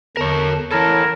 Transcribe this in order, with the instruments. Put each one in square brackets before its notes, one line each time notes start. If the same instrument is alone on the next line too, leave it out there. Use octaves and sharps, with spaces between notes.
[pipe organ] E2 D3 A5 [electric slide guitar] A#4 C#5
[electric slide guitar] E3 A4 [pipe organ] E4 C#5 A5 [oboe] A#4